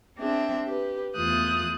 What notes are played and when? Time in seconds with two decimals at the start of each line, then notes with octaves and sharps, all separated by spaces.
0.18 C4 D4 G#4 E5
0.65 G4 B4
1.15 E2 A3 F4 D#6 F#6 G6